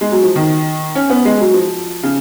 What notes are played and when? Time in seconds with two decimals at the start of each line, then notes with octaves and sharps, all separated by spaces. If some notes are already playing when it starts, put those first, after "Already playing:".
0.01 G#3
0.12 F#3
0.23 F3
0.36 D#3
0.95 C#4
1.10 B3
1.25 G#3
1.40 F#3
1.54 F3
2.03 C#3